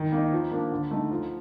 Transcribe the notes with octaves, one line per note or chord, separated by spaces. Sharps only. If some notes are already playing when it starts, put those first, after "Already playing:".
Already playing: D#3
A#3
D#4
F3
A#3 D4
D3
A3 D#4
F3